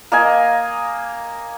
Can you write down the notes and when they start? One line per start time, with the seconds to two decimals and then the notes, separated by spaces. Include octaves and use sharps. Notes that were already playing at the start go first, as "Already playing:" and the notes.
0.12 A#3 D#5 G#5